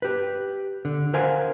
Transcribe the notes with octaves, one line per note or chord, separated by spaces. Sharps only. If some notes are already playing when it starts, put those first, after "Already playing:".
G4 B4
D3
A#4 C5 F5 F#5 G#5